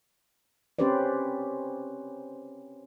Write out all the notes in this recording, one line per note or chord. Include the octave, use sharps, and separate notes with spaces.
C4 C#4 G4 B4 C5 D5